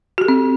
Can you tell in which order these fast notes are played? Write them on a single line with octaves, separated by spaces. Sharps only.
F#4 G4 A4 C4